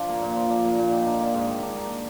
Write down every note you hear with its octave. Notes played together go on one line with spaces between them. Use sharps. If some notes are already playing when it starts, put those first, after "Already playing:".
Already playing: F3 D4
A#3
A#2
F3
D4
A#3
A#2
D#3
D4
A#3
G#2
D#3
D4
A#3